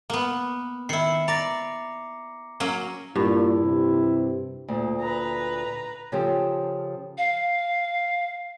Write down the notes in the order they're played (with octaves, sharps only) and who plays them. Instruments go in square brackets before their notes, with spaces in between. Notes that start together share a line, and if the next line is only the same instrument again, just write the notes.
[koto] A#3 B3
[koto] D#3 E4 [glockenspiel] C7 C#7
[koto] D5 [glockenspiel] A#5 D6 A#6
[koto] F#3 A#3 C#4
[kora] G2 [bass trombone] A#2 [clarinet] E4
[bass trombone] C3
[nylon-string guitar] D2 A#2
[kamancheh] B4 A#5
[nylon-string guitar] C#3 F3 G4 A4 C5
[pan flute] F5